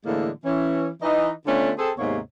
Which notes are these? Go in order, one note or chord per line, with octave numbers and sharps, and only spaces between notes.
A2 D3 E3 G#3 A#3
E3 C#4
E3 D#4 D#5
D3 A3 B3 C#4 D4 F4
C4 G#4 A4
D#2 G#2 C3 A#3 B3 C#5